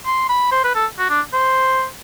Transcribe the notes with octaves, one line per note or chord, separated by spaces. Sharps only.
C6
B5
C5
B4
A4
F#4
D4
C5